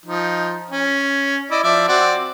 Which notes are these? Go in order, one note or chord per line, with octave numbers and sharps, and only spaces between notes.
F3 D#4
C#4
E4 D5 D#5
F3 D5 E5
C4 F#4 D5